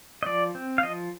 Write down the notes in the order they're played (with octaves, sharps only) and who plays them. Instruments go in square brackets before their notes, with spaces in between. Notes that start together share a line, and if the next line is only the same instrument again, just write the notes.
[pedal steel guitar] D#5
F3 D5
C4
F5
F3 D#5